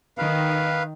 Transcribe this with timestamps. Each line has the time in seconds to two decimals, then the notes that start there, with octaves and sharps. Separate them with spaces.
0.18 D#3 B4 F5